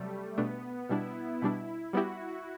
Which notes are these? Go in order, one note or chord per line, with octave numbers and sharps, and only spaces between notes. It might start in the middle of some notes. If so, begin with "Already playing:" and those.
Already playing: C3 F#3 G3 A3
B2 A3 B3 D4
B2 G3 D4 E4
B2 G3 D4 E4
G3 B3 E4 F#4 G4